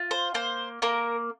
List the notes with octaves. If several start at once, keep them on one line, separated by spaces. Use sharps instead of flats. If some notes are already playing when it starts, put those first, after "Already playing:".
Already playing: F4
C5
A#3 C5
A#3 A#4